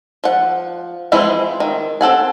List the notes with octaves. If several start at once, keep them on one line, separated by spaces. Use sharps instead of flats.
F3 F#5
E3 F3 G#3 C4 E4
D#3
C4 A4 F#5 G#5